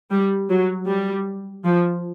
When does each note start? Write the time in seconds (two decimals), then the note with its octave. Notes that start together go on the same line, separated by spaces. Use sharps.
0.11 G3
0.50 F#3
0.87 G3
1.65 F3